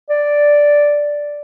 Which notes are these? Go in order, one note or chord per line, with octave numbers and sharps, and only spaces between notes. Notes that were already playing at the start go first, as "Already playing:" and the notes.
D5